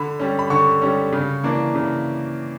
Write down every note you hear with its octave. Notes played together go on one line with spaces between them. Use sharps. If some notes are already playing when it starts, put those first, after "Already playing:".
Already playing: D3 B5
G3 C#4
B5
D3 C#6
G3 C#4
C#3
E3 A#3 D4
C#3